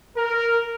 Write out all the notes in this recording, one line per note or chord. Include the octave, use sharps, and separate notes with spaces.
A#4